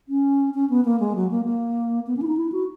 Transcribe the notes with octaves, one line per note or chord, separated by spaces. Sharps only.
C#4
C#4
B3
A#3
G#3
F#3
A#3
A#3
B3
C#4
E4
D#4
E4
F#4